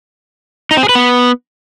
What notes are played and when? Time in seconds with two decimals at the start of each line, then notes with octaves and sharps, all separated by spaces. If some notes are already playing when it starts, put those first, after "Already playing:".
0.71 D#4
0.77 C4
0.83 G#4
0.89 B4
0.95 B3